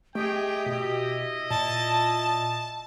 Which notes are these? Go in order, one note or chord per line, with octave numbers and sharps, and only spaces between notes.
A3 G4 G#4 D#5 G5
B2 E4 D#5
A#2 A5